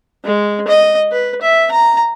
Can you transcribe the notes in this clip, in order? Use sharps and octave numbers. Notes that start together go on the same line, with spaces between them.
G#3
D#5
B4
E5
A#5